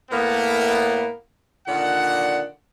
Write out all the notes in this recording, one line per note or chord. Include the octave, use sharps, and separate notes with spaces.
A2 A#3 B3
A#2 D3 D#3 D5 F#5